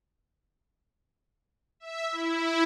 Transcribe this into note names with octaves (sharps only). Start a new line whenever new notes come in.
E5
E4